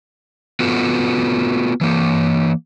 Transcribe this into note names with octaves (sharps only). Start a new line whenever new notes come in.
B3 F4 F#4 A4 B4
E3 A#3